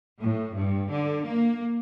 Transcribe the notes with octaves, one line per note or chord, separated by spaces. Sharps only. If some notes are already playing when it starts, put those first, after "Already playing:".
A2
G2
D3
A#3